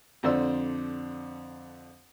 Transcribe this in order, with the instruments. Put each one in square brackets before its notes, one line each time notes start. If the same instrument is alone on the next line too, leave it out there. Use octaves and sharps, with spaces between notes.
[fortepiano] F2 D3 C5 D5 E6